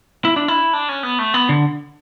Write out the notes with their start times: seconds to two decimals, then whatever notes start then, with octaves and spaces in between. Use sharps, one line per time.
0.25 E4
0.36 D4
0.48 E4
0.73 D4
0.89 C#4
1.03 B3
1.19 A3
1.34 B3
1.49 D3